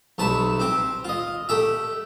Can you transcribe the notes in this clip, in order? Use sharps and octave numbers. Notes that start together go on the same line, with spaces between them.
B1 C3 A5 B5 C#6
C4 G4
F4 D#5
A3 G4 E5